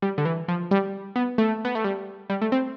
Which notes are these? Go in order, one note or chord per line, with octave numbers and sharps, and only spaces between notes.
G3
D3
E3
F3
G3
B3
A3
B3
A3
G3
G3
A3
C4